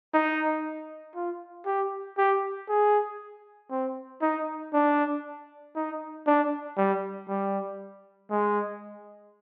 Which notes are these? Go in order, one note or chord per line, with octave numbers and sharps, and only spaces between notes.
D#4
F4
G4
G4
G#4
C4
D#4
D4
D#4
D4
G3
G3
G#3